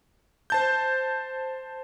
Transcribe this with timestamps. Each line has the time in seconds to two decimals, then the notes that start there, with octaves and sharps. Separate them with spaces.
0.50 C5 A5 G6